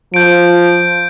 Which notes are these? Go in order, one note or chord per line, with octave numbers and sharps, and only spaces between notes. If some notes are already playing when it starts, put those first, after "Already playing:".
F3 G6 D7